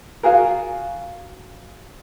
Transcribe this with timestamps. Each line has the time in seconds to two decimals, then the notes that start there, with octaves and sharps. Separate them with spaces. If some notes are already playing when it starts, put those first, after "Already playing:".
0.23 F4 F#4 G#4 A#4